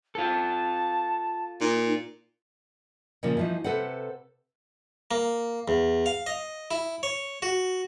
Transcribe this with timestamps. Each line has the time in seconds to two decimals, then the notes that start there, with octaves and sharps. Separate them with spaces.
0.15 F4 A4 A5
1.61 A#2 D#4
3.23 A#2 C#3 F3
3.37 E3 F3 D#4
3.64 C3 A4 B4 C5 F#5
5.11 A#3
5.68 E2
6.06 F5
6.27 D#5
6.71 E4
7.03 C#5
7.42 F#4